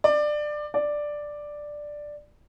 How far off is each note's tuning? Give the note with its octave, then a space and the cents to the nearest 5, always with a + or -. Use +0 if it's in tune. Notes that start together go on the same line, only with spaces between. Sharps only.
D5 +20
D5 +5